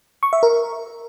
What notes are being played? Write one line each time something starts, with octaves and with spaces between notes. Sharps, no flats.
C#6
E5
A#4